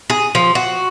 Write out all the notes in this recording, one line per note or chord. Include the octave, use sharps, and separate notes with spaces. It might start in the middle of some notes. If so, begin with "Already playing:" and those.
G#4
F3
F#4